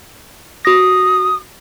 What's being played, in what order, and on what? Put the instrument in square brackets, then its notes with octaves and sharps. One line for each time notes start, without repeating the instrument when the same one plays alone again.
[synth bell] F#4 A#6 [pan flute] D#6